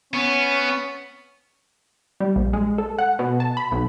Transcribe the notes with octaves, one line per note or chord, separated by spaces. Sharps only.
B3 C#4
G3
A#1
G#3
A4
F#5
B2
A5
B5
B1